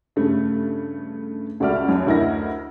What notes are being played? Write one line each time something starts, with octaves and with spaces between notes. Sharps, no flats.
G2 C#3 A3
C#2 F#4 A4 D5 E5 F6
F#2 A5
D2 A3 E4 A#4 D#5 A#6